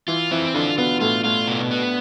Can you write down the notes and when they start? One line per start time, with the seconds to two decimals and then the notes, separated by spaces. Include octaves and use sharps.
0.08 E3 E4 F4
0.31 E3 C4 E4
0.54 D3 D4 F4
0.78 B2 B3 F4
1.01 A2 A3 F4
1.24 A2 A3 F4
1.48 B2
1.71 B3